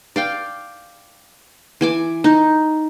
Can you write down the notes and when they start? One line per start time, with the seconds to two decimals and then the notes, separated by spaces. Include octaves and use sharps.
0.16 D5 F5 G5
1.81 E3 G#5 D6
2.24 D#4